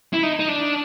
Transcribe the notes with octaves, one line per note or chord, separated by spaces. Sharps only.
E4
D#4
D#4
D4